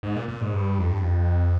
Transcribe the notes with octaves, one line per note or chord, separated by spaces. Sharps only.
G#2
A#2
A#2
G#2
G2
F2
G2
F2